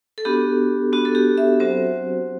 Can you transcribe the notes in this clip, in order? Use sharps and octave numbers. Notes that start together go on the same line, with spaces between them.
A4
B3 D4 F#4 G4
B3 D4 F#4
A4
G4
E5
F#3 C4 F#4 C5